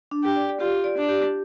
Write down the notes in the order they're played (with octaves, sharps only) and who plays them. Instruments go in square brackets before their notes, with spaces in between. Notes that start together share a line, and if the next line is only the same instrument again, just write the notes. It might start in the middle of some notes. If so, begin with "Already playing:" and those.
[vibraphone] D4
[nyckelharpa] G4
[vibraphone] D5
[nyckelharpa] F4 [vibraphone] G4
[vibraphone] D5
[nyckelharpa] D4
[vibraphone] G4